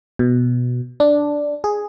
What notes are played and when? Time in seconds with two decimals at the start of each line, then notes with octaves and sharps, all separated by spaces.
0.19 B2
1.00 D4
1.64 G#4